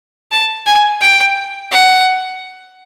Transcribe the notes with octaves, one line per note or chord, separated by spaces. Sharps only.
A5
G#5
G5
F#5